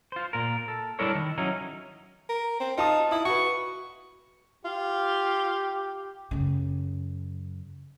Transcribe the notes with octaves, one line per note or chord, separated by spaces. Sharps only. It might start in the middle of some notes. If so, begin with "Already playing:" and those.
F4 C5
A#2 A#4
A4
G3 D4 E4 A4 A#4 C#5
D#3
F#3 C#4 D#4 E4
A#4
C4
D#4 F4 A5 D#6
E4 D#6
F#4 B4 C#6
F4 G4
F#2 C#3